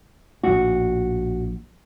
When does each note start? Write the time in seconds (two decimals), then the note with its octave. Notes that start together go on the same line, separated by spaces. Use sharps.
0.43 A#1 A2 F#4